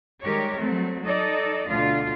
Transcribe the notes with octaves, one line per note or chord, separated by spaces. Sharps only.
D#3 G3 G#3 G4 A#4 C#5
F#3 G3 A3 C4
D#4 A4 D5 D#5
D2 B2 D3 F4